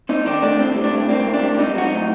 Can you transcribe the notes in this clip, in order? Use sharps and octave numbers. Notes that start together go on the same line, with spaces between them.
C4 D#4
D#3 D4
A3 D4
A2 C4
G3
D4
A2
A#3 C4
A2
D4
G3
C4 D#4
F#3 F#4
D#4
A2